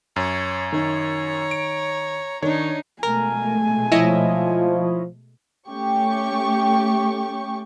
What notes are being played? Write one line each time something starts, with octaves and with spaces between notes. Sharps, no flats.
F#2 C#5
D#3 C#5 A#5
D7
D#3 D4 D#4 C#5
B2 G#3 A3 A#4 G#5
F3 E4 C#5 D#5
A3 C#4 G4 C#6